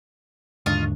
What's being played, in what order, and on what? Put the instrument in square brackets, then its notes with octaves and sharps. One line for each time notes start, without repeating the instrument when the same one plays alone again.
[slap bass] D#2 D4 [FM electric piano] G#2 D3 [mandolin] F4 D#5 C#6